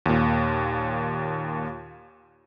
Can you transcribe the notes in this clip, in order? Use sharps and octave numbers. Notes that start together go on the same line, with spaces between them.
D#2 A#2